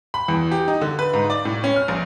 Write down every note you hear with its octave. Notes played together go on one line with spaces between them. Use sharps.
B5
E2
G4
D#4
D3
B4
G#2
D5
A2
C#4
F6
A#1